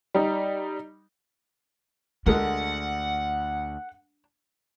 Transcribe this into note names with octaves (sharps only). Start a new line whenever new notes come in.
G3 D#4
D2 G#3 A3 D4 A#4 F#5